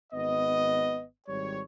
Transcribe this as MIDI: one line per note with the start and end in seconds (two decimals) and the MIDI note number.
0.13 1.04 32
0.13 1.04 59
0.13 1.04 75
1.27 1.61 32
1.27 1.61 55
1.27 1.61 73